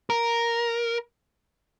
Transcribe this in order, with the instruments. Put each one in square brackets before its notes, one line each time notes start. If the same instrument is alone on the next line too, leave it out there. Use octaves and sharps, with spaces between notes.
[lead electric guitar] A#4